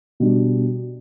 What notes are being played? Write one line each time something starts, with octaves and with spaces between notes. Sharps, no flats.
B2 G3 D4